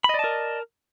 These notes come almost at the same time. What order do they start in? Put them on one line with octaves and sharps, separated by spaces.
B5 D#5 D5 A5 A#4